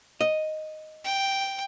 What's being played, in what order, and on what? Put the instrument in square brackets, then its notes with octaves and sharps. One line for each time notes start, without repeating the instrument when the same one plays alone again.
[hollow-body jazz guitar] D#5
[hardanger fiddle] G5